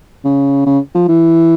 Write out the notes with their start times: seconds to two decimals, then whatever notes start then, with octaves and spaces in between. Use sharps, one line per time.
0.25 C#3
0.66 C#3
0.95 F3
1.09 E3